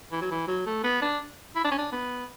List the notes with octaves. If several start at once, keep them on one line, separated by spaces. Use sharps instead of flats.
E3
F#3
E3
F#3
A3
B3
D4
E4
D4
C#4
D4
B3